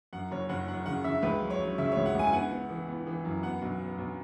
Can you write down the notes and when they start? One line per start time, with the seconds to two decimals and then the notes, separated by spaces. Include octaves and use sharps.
0.13 F#2 F#5
0.31 F#1 C#5
0.49 F#1 F#5
0.68 F#2 F#5
0.86 C#3 F#5
1.04 C#3 E5
1.22 C#2 B4
1.41 F#3
1.50 C#5
1.60 F#3
1.78 C#3 E5
1.92 C#2 C#5
2.06 F#5
2.14 C#2 G#5
2.27 G#5
2.33 B3 F#5
2.51 B3
2.70 E3
2.88 B3
3.07 E3
3.25 F#2
3.43 B3 F#5
3.62 B1
3.80 B3
3.98 B1